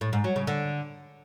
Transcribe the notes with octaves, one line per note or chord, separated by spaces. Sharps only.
A2
G#2
F#3
C#3
D3